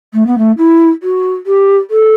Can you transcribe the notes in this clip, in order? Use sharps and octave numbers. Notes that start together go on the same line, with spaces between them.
A3
B3
A3
E4
F#4
G4
A4